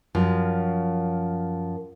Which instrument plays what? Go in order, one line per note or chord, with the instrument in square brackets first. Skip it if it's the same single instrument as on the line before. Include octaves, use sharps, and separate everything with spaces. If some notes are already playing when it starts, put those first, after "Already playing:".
[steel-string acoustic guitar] F#2 F3